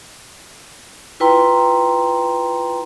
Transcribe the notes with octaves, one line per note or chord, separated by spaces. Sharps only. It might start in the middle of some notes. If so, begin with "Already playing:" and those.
E4 F4 B4 G5 A#5 C6